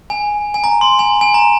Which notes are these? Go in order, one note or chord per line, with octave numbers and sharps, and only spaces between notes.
G#5
G#5
A#5
C6
G#5
G#5
A#5